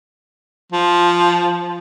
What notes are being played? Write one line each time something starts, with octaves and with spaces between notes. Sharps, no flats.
F3